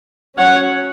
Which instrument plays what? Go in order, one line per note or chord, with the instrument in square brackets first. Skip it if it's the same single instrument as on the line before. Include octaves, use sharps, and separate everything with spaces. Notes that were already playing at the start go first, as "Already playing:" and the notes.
[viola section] F#3 C#4 C#5 F#5